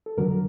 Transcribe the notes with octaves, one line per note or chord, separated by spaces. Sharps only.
A4
F2 D3 F#3 A#4